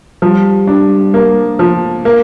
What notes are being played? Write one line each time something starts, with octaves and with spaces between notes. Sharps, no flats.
F3 G3
D4
A#3
F3
A#3